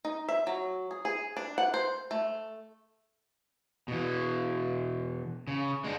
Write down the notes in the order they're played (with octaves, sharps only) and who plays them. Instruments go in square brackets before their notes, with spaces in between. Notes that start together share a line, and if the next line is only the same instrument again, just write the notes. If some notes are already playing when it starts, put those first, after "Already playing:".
[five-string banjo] D#4
E5
F#3
G#4
G#4
D4
F#5
C5
A3
[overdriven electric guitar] B2 E3
C#3
G#3 D4